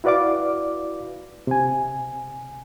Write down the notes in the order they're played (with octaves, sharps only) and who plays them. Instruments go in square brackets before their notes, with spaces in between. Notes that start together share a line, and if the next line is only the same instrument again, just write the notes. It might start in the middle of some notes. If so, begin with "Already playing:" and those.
[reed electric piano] E4 F#4 B4 D5 F5 D6
C3 G#5